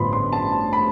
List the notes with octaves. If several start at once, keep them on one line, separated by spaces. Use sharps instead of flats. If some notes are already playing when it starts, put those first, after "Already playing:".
Already playing: A1 G2 D3 F3 B3 B5 C6
C6
A5
B5